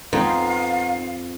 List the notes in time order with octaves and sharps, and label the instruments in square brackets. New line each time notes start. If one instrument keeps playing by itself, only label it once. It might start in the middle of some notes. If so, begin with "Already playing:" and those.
[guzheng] F2 [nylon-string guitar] B3 D#4 [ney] F5